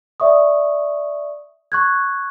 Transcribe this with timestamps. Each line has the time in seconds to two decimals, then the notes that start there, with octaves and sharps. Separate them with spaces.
0.20 D5 E5 C#6 D#6
1.72 C#6 F#6 G#6